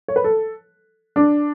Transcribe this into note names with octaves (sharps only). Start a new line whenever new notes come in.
C#5
B4
A4
D4